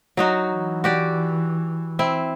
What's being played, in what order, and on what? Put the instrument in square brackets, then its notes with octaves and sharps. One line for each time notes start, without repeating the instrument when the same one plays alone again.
[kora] F#3 D#4 F#4
[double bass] E3
[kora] F#4 G4 D5
C4 E4